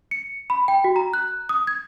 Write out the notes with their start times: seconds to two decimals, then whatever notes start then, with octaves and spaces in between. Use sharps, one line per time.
0.11 C#7
0.50 B5
0.68 G5
0.84 F#4
0.96 A#5
1.13 F#6
1.49 D#6
1.67 G#6